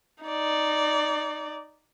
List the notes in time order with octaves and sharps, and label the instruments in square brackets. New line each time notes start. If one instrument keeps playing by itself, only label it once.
[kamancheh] D#4 D5